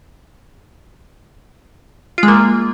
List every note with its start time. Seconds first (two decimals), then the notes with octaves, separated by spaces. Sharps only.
2.18 F4
2.23 G#3
2.28 A#3